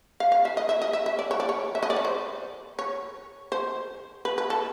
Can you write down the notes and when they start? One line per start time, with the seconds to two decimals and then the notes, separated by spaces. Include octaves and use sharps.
0.20 F5
0.32 F5
0.45 E5
0.57 D#5
0.69 E5
0.82 D#5
0.93 E5
1.06 E5
1.19 D5
1.31 C#5
1.40 D5
1.49 C#5
1.75 E5
1.83 D#5
1.90 D5
1.96 C#5
2.05 C5
2.79 C#5
3.52 C5
4.25 B4
4.38 B4
4.50 A4